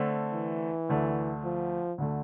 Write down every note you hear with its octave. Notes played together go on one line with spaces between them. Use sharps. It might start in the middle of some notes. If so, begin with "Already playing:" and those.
Already playing: D3 A3 C4
E3
D2 D3 A3 D4
F3
D2 D3 A3